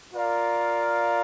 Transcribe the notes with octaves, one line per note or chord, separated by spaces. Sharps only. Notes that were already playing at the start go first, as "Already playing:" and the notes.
F4 A#4 D5 F5